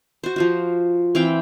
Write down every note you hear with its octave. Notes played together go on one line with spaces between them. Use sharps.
F#4 C5
F3 F4 F#4
E3 C4 F5 G5